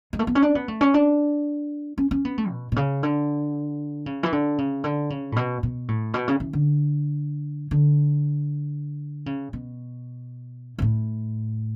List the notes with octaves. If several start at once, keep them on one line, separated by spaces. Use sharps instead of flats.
G#3
A3
B3
C#4
D4
B3
A3
C#4
D4
C#4
C#4
B3
A3
B2
B2
C#3
D3
C#3
E3
D3
C#3
D3
C#3
A2
B2
B2
A2
B2
C#3
E3
D3
D3
C#3
B2
B2
A2